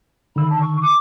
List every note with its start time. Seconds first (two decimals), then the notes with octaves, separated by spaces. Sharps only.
0.36 D3 D#3 B5 E6
0.49 A5
0.61 C#6
0.81 D6